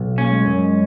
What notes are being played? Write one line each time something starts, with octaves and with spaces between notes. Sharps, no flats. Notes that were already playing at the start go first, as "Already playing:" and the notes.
Already playing: B1
A#3 C#4
G#3
F#2 F#3
G#3